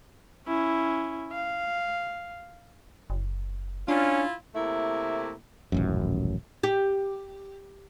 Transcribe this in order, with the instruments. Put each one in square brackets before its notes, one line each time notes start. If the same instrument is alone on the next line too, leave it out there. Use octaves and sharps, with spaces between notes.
[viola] C#4 E4
F5
[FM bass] F#1
[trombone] C#4 [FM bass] D4 [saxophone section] E4 F4
[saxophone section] C3 A3 A#3 E4
[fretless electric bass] D#1 A1 F#2
[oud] G4